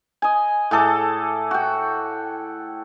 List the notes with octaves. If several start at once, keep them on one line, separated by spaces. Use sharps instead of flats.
D#5 G#5
A2 G#4 A4 D6
F#4 G5